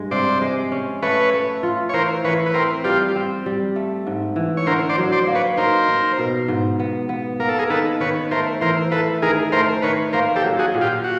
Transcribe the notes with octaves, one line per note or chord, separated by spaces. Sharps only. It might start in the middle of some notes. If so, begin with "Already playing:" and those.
Already playing: G2 G#3
C3 C5 D5
G#3
C#4
A3 B4 C#5
A3
F4
C#5
E3 A#4 C5
E3 B4 C#5
B4
C4 A#4 C5
G3 F4 G4
C4
G3
A3
G#2
E3
C#5
D3 A#4 C5
C5 D5
F#3
C5 D5
A#3
B4 C#5
D#4 A#4 C5
D#4
B2
G#2
B3
B3
A#3 A#4
A4
G#4 A#4
D#3 A4 B4
D#3 B4 C#5
A3 A#4 C5
E3 A#4 C5
A3 A4 B4
D#3 G#4 A#4
A3 A#4 C5
D#3 B4 C#5
A#3 A#4 C5
G4 A4
F#3
F#4 G#4
A#2
F4 G4
F#4